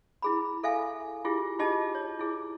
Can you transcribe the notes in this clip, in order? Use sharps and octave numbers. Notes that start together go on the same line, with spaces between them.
E4 G#4 B5
A4 E5 F5 G#5
E4 F4 G4 G#4
D#4 F4 G4 G#4 D#5 A5
C#5
E4 G#4